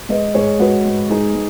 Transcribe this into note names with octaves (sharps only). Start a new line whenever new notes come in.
G#3 B4 D#5
G#2 G#4 C#5
G#3 F#4 B4
G#2
G#2 D#4 G#4
G#3